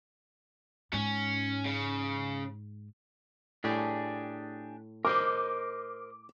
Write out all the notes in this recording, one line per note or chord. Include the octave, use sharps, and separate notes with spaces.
G#2 C#4
C#3
A2 D4 G4 G#4
A#4 C5 D#5 D6